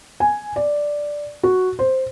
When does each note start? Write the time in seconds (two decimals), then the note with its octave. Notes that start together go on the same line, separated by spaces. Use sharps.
0.20 G#5
0.56 D5
1.43 F#4
1.79 C5